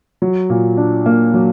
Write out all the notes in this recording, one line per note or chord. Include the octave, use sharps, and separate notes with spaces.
F#3
A#2
D4
A#3
F#3